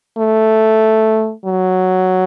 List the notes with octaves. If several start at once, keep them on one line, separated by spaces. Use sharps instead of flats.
A3
F#3